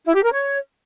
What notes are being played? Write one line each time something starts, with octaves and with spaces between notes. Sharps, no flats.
E4
G4
A#4
C#5